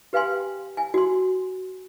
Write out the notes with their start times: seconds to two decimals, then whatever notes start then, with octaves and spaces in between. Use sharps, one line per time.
0.13 G4 B4 F5 G5 G#5 C6
0.77 G#5
0.94 F#4 C6